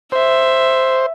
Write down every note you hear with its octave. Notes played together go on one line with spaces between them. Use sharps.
C5 E5